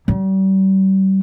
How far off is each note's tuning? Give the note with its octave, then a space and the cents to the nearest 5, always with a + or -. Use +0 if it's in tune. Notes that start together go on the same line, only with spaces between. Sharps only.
G3 -35